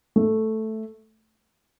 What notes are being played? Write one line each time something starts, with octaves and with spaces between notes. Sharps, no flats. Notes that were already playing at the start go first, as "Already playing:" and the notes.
A3